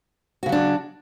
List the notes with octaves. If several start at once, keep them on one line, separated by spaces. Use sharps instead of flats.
C#3 F#3 D4 F#4